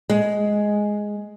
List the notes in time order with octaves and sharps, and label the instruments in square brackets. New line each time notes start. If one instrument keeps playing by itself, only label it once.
[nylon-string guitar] G#3